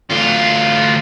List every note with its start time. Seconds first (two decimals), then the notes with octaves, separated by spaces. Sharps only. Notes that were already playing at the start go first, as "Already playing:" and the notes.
0.10 D2 F4